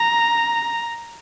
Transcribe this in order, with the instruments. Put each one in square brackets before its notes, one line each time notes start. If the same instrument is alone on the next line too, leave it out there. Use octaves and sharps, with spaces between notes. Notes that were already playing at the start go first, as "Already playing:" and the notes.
Already playing: [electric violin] A#5